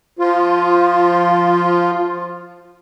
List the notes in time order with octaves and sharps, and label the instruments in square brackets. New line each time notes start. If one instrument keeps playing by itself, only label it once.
[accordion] F3 F4